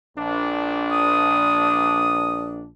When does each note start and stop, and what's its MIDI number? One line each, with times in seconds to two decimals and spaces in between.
0.17 2.69 34
0.17 2.69 62
0.91 2.52 87